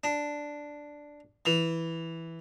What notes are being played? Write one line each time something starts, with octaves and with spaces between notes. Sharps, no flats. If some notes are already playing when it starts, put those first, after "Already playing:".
D4
E3